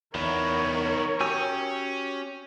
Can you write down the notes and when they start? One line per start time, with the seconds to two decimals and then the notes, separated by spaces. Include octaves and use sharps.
0.15 E2 D#3 B3 A#4 C#5 B5
1.21 C#4 F#4 G4 G5 G#5 D#6 E6